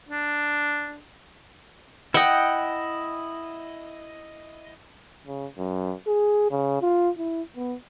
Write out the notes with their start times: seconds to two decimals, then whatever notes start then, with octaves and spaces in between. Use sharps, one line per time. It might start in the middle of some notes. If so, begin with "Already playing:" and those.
0.09 D4
2.14 E4 D#5 F#5 G5
5.27 C#3
5.58 F#2
6.07 G#4
6.51 C#3
6.82 F4
7.18 E4
7.56 B3